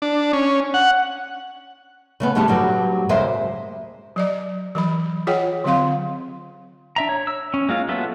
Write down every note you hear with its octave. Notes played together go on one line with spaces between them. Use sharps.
D4
C#4
F#5
C#3 A3 B3
D3 G3 A3 G#4 A5
G2 F#3 G3 C4
D#2 C#3 G#3 G#4 C5 E5
F#3 D5 D#5
E3 F#3 B5
F4 G#4 C#5 D#5 F#5 G5
D3 F#3 C4 F5 C6
D4 E5 A#5
C#5
E6
C#4
G#3 A#3 F4
F#3 B3 F4 A4 E5